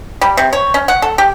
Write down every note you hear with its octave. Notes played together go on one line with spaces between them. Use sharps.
G3
C3
C#5
C#4
F#5
A4
G4